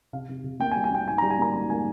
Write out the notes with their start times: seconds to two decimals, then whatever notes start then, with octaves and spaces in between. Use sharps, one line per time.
0.13 C3 F5
0.29 C3
0.44 C3
0.60 A#3 G5
0.71 G#5
0.76 G3
0.84 G#5
0.92 A#3 G5
1.07 G#2 G#5
1.18 G3 A#5
1.30 G#5
1.39 A#3 A#5
1.54 G#2 A#5
1.70 A#3 G#5